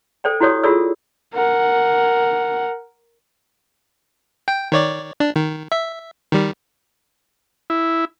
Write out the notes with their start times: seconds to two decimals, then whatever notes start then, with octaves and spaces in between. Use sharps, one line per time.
0.24 A4 C5 D5 G5
0.40 E4 F#4 G4 C#5 D5 D#6
0.63 F4 F#4 G#4 A4 D5 E6
1.34 A#4 F#5
4.48 G5
4.72 D#3 C#5 D5
5.20 D4
5.36 D#3
5.72 E5
6.32 D#3 G3
7.70 E4